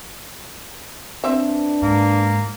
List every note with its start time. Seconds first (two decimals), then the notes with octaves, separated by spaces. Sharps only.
1.24 C4 D4 B4 E5
1.83 G#2 A#3